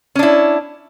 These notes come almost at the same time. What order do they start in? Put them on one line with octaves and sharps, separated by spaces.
C#4 D4 E4